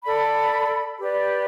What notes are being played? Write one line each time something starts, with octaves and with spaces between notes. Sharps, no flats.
A4 D5 B5
G4 B4 D5